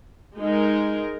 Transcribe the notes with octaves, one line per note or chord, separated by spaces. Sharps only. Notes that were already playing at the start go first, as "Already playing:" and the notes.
G#3 D#4 A#4